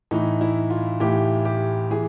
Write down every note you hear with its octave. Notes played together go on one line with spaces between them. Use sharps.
A2 E3 D#4
E4
F4
A2 E3 G4
G4
E3 G#4